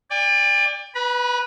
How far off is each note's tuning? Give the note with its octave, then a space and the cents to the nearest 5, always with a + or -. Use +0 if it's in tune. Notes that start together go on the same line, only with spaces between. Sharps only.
D5 +0 G5 +45
B4 +0 B5 -40